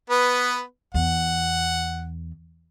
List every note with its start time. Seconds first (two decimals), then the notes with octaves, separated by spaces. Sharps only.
0.10 B3 B4
0.94 E2 F#5